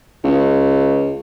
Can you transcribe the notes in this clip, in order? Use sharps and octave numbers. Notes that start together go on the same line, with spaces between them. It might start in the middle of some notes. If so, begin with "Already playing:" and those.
C#2